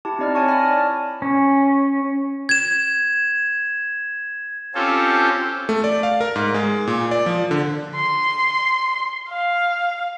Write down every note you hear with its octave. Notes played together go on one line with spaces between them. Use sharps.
E4 G4 A5
C4 D#4 E4 D5 D#5 F6
C#5 G#5 A5 C#6
D5 G#5 A5 B5 F6 A#6
D5
C#4
G#6 E7
C4 C#4 F4 G4 A4 C5
A3
D5
F5
A#4
G#2
G#3
A#2
D5
F3
D3
C6
F5